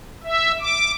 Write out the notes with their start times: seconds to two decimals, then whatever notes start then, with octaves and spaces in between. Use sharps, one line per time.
0.24 E5
0.61 D6